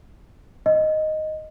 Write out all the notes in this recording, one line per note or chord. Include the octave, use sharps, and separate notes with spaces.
D#5